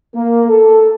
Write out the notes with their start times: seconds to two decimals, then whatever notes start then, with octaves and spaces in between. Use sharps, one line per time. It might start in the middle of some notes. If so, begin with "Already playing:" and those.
0.14 A#3
0.49 A4